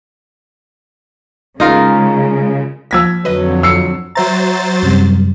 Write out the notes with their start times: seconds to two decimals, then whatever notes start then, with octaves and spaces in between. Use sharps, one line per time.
1.60 C#3 G#3 D#4 F4 A#4
2.91 F3 A#3 E6 G#6 A#6 B6
3.25 F2 D3 F#3 B4 D#5
3.63 E6 C7 C#7
4.15 F#3 C5 E5 A#5 A6
4.83 F#2 C3 G3